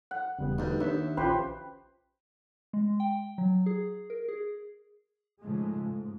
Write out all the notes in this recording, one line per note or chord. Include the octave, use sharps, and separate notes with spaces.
F#5
E1 C#3 G3 B3
D2 G2 D#4
D#2 D4 E5
A#1 C#4 F4 G4 B4 C5
G#3
G5
F#3
G#4
A#4
G#4
G#2 C#3 F3 G#3 A3
G#2